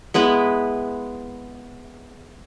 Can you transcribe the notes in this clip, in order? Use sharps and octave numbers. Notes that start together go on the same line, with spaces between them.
G#3 B3 E4 B4